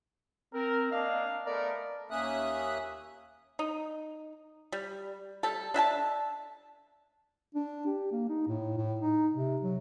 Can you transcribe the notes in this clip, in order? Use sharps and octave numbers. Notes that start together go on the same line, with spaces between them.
C4 A#4
A#3 D4 D#5 F5
A3 B3 A#4 D5
D#2 A#3 C#4 E5 D#6 F#6
D#4
G3
G3 A4
D4 E5 G#5 A5
D4
G4
A#3
D#4
A2
A2
D#4
C3
F#3